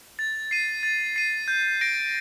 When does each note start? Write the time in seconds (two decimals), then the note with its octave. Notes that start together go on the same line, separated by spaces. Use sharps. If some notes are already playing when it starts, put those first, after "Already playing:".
0.19 A6
0.51 C7 D#7
0.83 A6
1.16 C7 D#7
1.48 G6
1.81 A#6 D7